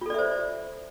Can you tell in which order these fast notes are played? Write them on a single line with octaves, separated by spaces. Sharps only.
F4 A4 D5 E5 C5